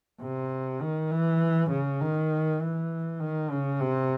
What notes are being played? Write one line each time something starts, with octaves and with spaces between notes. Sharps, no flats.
C3
D#3
E3
C#3
D#3
E3
D#3
C#3
C3